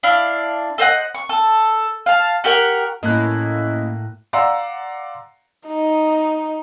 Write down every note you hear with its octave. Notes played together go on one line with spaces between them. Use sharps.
D4 E4 F5
A4 C5 D#5 F#5
C#6
A4
F5 A5
F#4 G4 A#4 F#5
A2 A3 A#3 C#4 E4 D#5 F#6
D5 F5 F#5 A#5 C6 E6
D#4